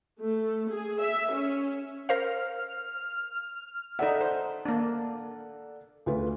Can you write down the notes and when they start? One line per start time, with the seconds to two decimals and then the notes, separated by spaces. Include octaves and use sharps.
0.23 A3
0.70 G#4
1.04 E5
1.34 C#4
2.09 A#4 C5 F5 F6
3.99 D#4 A4 D5 E5 F#5
4.21 C5
4.65 A#3 D4
6.06 D2 F4 B4